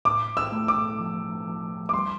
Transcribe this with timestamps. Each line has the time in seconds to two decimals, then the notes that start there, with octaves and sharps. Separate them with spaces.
0.05 A2 D6
0.37 E6
0.52 A3
0.68 D6
1.00 F3
1.46 F3
1.89 D6
1.93 G3 C6